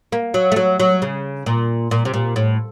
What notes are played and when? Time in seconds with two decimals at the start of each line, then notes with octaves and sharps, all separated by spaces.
0.12 A#3
0.34 F#3
0.52 A3
0.56 F#3
0.80 F#3
1.02 C#3
1.46 A#2
1.91 A#2
2.05 C3
2.14 A#2
2.36 A2